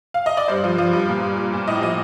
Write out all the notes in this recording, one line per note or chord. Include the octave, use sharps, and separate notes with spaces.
F5
D#5
D5
G2 C5
F3
F3
G2
A#2
G3
G3
A#2
A2 D#5
F3 D#5